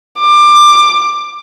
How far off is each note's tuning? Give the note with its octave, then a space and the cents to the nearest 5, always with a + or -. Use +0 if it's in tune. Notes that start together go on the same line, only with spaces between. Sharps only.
D6 +20